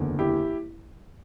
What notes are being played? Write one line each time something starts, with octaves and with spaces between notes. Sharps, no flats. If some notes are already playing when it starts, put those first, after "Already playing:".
Already playing: F#1 E2 D3
E4 G4